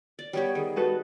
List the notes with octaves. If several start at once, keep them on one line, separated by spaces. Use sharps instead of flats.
D5
G3 B3 G4 C#5
D#3 G#4
F#4 A4 B4